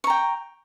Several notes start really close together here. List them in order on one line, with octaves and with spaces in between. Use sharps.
C#6 A#5 G5